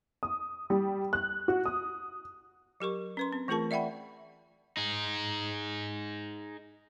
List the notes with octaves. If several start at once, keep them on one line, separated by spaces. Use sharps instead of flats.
D#6
G3
F#6
F#4
D#6
F#3 G4 A#4 C#6
C#4 B4 C6
C4
E3 A3 F4 G#4 A#4 A5
D5 E5 F#5 G5 B5
D#4 G#4